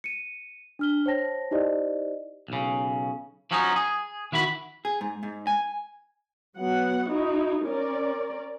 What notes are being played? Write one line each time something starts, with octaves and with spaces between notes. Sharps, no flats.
C#7 D#7
D4 F6 G7
C5 C#5 G5 A5 A#6
D#4 E4 G4 C5 D5 D#5
B1 C#3
F3 F#3 C#4 D#4
G#4
D#3 E4 F#4 B5
G#4
G#2
G#2
G#5
F#3 B3 F#5
D#4 E4 F#4
C#4 A#4 D5